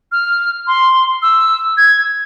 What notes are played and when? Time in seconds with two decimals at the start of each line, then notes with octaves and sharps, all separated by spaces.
0.12 F6
0.67 C6
1.22 E6
1.77 G#6